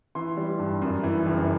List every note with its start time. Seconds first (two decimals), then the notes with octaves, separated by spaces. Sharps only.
0.15 E3 C6
0.37 G3
0.59 G2
0.82 F#2
1.03 E3
1.26 F#1